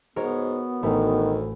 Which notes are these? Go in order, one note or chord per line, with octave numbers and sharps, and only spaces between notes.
G#2 B3 F#4 A#4 C#5
A1 D2 D#3 A3 B5